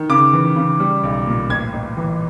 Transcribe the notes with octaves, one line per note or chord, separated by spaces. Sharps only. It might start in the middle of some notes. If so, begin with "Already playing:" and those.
Already playing: D#3
C#3 D6
E3
C#3
G3
B1
A#2
A1 G#6
A1
E3